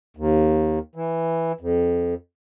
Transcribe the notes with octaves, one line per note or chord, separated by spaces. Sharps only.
D#2
E3
F2